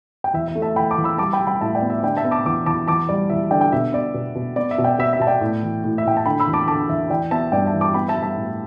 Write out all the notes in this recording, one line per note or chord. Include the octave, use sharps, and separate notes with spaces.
G5
E2 E5
E5
A3
E5 A5
E2 G5 B5
A5 D6
E2
B5 E6
G3 A5 D6
G5 B5
G3
G5 B5
A2 E5 A5
D5 G5
B3
E5
D3 D5 G5
E5 A5
B3
A5 D6
E2 A5 D6
E2 A5 D6
E2 A5 D6
G3 D5
E2 E5
D3 D5 G5
G5
B2 E5
B3 D5
B2
B2
B3 D5
E5
B2
D5 G5
B2 E5
E5
B2 A5
D5 G5
A2
E3
A2
E5
A2 G5
A5
D3 G5 B5
B5 E6
E2
A5 D6
D3 A5 D6
E2 E5
E3 D5 G5
B3 E5 A5
G2 D5 G5
E5 A5
E3
A5 D6
B3 G5 B5
E5 A5
G3
E5 A5
A2